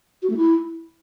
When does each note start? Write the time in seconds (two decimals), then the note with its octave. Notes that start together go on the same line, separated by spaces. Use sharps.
0.22 F#4
0.30 A3
0.37 E4